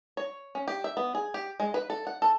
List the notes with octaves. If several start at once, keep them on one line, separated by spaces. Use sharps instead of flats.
C#5
C#4
G4
E5
B3
G#4
G4
G#3
B4
A4
F#5
A4